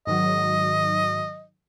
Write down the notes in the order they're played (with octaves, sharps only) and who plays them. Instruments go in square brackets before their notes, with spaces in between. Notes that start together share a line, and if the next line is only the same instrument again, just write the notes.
[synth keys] G#2 D#3 F#3 [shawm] D#5